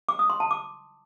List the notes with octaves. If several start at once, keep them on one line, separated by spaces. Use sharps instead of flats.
D6
D#6
C6
A5
D6